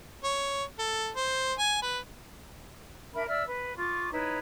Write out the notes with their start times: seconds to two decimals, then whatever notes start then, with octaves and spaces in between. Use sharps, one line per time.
0.24 C#5
0.79 A4
1.16 C5
1.58 G#5
1.82 B4
3.13 D4 A#4 E5 B5
3.27 D5 E5 E6 F6
3.46 B4
3.77 F4 C#6 D6
4.11 D#4 E4 B4 C#5